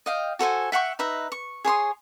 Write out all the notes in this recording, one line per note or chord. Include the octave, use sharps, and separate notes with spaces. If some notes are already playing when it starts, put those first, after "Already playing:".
D#5 F5 G5
F#4 A4 C5 G#5
E5 F#5 G5 C#6
D#4 B4 E5 A#5
C#6
G#4 C#5 C6 D#6